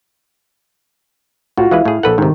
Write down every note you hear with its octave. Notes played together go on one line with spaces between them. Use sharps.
A2 F4 F#4
E3 G#3 E4 B4 F5
A2 G#4
A#1 A4 B4 F#5
G#2 C3 D#3